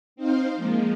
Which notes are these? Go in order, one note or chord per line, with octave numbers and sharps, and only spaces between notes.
C4 D#4 C5 F5
F3 G#3 A#3